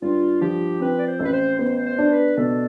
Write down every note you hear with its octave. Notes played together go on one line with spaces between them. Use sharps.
G2 F4
F3 G4
C4 B4
D5
C5
A1 A4
B4
C5
B3 C5
C5
D4
B4
B2 A4